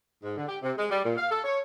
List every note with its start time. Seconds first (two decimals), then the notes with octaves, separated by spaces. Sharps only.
0.23 G#2
0.37 D3
0.48 G4
0.63 C3
0.78 G#3
0.90 G3
1.05 A#2
1.17 F5
1.31 A4
1.44 C#5